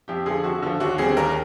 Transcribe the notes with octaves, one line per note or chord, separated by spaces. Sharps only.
F2 G4
D3 F3 G#4
F2 F#4
D3 F3
D#2 F#4
D3 G3 C4 G#4
D#2 A#4